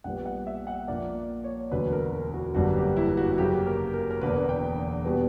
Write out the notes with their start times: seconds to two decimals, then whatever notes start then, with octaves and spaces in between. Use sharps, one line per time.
0.04 A#1 A#2 G3 B3 F#5
0.26 F#5
0.47 E5
0.67 F#5
0.88 A#1 A#2 A#3 D5
1.44 C#5
1.71 E1 D2 D3 F#3 B4
1.92 A#4
2.13 A#4
2.34 F#4
2.55 G1 F#2 D3 G3 A#3 F#4
2.76 G4
2.96 E4
3.17 F#4
3.33 F#4
3.38 F#2 C#3 F#3 A#3 G4
3.66 A#4
3.94 A#4
4.11 A#4
4.21 E1 E2 D3 A#3 B4
4.49 G5
5.05 B2 G3 B3